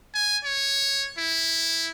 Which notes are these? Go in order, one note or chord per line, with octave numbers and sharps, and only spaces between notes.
G#5
C#5
E4